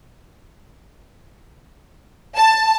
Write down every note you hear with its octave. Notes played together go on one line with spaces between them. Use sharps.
A5